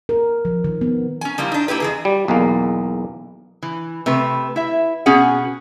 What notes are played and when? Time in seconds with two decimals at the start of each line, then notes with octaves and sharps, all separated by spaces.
0.09 A#4
0.45 F3
0.64 D#3
0.81 B3
1.21 C#4 G#5
1.38 F3 G3 A#3 E4
1.52 D4 D#4
1.68 A#3 E4 G4 B4
1.80 F2 E3 G#4
2.05 G3
2.28 B1 E2 G#3 A#3
3.63 E3
4.06 C3 A3 B4
4.56 E4 E5
5.06 B2 C#4 F#4 G#4 F#5